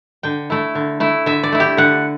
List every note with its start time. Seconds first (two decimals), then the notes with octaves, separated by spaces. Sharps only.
0.23 D3 G5
0.50 A3 E4
0.75 D3
1.00 A3 E4
1.26 D3 E5
1.43 D5
1.52 A3 E4
1.60 G4
1.77 D3 F#5